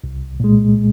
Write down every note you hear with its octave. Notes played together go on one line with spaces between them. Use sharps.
C2
A#2 G#3